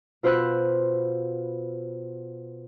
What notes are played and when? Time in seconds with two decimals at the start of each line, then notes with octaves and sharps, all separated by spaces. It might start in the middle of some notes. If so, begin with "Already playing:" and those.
0.23 B2 F4 C5 B5 E6 F#6